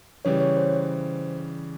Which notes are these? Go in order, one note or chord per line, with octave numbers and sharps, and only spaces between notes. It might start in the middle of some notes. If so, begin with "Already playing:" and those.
C#3 E3 G3 C#5
C#5
C5